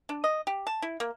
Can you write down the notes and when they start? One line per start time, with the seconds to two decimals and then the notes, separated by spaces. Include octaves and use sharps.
0.09 D4
0.24 D#5
0.47 G4
0.67 A5
0.82 E4
1.00 A#3